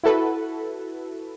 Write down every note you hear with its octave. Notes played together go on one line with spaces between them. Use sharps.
E4 F#4 A4 B4